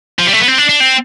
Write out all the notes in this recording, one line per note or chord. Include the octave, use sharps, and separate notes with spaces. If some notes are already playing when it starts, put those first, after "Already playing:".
F3
G3
A3
B3
C4
D4
D4
C4